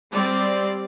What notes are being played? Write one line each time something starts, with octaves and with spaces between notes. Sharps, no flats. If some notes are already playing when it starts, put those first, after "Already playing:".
G3 C4 D5